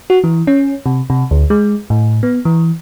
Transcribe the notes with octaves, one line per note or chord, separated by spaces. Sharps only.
F#4
E3
C#4
C3
C3
D2
G#3
A2
B3
E3